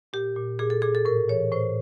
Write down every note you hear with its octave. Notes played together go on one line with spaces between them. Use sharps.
A#2 G4
A#2
A#2 G#4
A4
A#2 G#4
A4
A2 A#4
E3 C#5
A2 C5